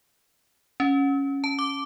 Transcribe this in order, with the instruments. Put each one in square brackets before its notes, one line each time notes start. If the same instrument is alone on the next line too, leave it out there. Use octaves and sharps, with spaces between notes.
[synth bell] C#4
A5
D6